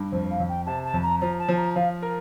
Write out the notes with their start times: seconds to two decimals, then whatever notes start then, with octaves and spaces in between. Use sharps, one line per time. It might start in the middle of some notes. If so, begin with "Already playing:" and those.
Already playing: G2
0.12 F2 C5
0.30 F5
0.40 F2
0.49 G5
0.66 C3 A5
0.85 A5
0.94 F2
1.03 A#5
1.21 F3 A#5
1.39 A5
1.48 F3
1.57 A#5
1.76 F3 F5
2.02 A#4